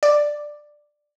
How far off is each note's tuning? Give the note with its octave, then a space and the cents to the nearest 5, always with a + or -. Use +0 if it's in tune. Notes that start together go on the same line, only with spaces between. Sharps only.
D5 +10